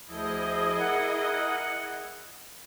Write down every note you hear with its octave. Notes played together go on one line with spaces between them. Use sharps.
D2 F3 E4 G#4 D#5
A#4 F#5